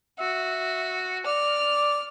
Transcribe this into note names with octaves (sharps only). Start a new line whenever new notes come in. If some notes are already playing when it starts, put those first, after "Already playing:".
F#4 E5
D5 F6